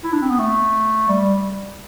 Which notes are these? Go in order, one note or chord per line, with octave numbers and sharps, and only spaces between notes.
E4
D4
C4
B3
A3
G3